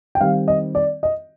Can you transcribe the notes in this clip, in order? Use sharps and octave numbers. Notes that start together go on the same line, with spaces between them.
G5
D#3 G3 C4 F5
D#5
D5
D#5